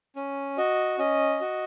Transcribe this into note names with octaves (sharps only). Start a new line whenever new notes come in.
C#4
F#4 D#5
C#4 D#5
F#4